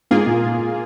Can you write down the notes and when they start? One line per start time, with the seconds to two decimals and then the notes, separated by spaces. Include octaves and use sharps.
0.11 G#2 A#3 F4 G#4
0.26 A#2